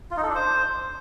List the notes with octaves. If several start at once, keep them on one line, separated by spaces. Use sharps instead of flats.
F4
D#4
A4
D4
C5